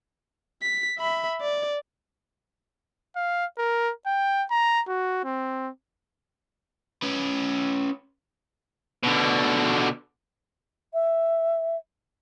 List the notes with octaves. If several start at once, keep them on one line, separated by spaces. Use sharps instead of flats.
B6
E5 B5
D5
F5
A#4
G5
A#5
F#4
C4
C#4 B4
B2 D3
E5